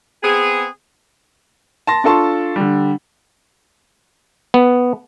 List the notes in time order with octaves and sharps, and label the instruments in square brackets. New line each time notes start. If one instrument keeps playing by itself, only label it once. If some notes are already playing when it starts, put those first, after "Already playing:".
[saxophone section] B3 C4 G#4
[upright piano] A5 C6 A#6
D4 F4 A4 A5 C6 C#6
D3 G3
[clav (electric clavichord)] B3